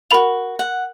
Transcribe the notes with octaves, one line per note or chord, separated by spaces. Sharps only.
F4 F#4 A#4 B5 F7
F#5